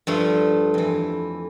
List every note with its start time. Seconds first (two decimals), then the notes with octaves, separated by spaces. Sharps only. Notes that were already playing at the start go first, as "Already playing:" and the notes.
0.07 G2 F3 A3
0.74 F2 E3